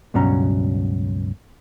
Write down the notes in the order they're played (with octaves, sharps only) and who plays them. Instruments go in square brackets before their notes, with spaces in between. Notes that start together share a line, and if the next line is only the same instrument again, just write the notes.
[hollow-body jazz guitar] C#2 G2 B2 F#3 C#4 A#5